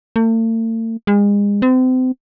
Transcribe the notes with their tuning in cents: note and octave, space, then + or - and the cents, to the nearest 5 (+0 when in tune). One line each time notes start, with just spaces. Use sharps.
A3 +45
G#3 -35
C4 -35